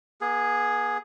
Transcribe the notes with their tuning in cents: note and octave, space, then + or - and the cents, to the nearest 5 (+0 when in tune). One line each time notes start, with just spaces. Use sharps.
B3 -40 G#4 +0